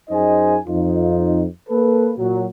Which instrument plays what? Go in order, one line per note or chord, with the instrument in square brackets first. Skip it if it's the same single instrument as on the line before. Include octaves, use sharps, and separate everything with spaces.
[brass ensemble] F#2 D#4 G#4 C5 D#5 G#5
F2 D#4 F4
A#3 A4 B4
A#2 F#3